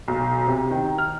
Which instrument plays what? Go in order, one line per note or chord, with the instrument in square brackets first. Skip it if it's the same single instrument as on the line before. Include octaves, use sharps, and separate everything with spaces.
[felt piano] B1
C3
D#3
F6